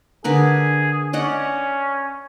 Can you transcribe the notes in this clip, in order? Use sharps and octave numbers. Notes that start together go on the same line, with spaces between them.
D3 G#4 A#4 B4
C#4 D5 D#5 F#5